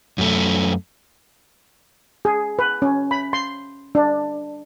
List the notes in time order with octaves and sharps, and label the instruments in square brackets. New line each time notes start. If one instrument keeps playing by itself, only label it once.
[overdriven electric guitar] F#2 A3
[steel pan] G#4
B4
C#4
B5
C6
D4